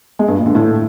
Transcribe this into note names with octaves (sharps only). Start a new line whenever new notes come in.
G#3
G2
A#2
D3
A2